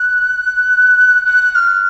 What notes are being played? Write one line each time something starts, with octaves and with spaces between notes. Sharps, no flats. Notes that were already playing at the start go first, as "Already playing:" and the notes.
Already playing: F#6
F#6
F#6
F6